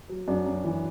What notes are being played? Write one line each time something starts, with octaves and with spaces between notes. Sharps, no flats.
F#3
F#2 D4 F#4
F#2
E3